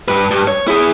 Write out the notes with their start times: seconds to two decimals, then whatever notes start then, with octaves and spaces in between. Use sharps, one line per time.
0.08 G2 B4
0.31 G2
0.47 C#5
0.68 E4 G#4